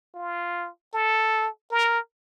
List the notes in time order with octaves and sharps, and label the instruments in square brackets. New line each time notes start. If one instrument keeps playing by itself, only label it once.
[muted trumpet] F4
A4
A#4